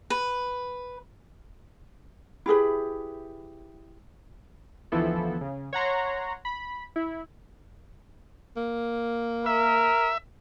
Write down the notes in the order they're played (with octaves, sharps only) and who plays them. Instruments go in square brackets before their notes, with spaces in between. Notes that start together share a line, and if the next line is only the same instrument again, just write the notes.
[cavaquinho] B4
[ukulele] E4 G4 G#4 B4
[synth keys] D2 E3 F3 B3 E4 A4
C#3
C#5 F#5 A#5 C6
B5
E4
[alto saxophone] A#3
[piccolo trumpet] A#4 [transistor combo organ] E5